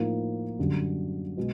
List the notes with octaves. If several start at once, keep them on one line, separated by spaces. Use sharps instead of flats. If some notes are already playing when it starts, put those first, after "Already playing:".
Already playing: A2 F3 A#3 D#4
F#2 D3 G3
B2 G#3